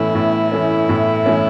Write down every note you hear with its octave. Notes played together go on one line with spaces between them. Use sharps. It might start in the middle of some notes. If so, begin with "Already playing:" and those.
Already playing: A2 E3 A3 C#4 E4
A2
E3 A3 C#4
A2
E3 A3 C#4